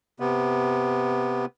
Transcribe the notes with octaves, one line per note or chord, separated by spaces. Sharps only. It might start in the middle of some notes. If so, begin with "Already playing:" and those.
C3 B3